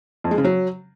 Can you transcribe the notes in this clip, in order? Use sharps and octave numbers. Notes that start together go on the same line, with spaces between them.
F2
G#3
C#3
F#3